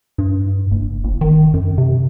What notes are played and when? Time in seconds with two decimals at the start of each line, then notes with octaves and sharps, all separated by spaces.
0.18 G2
0.71 F#1
1.04 G1
1.21 D#3
1.54 F#2
1.78 C3